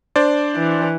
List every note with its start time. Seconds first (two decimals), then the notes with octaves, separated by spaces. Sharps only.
0.16 D4 C5 D5
0.56 E3